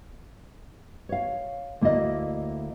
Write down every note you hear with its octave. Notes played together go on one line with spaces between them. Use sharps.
C#5 F5
D2 A#3 E4 D5 D#5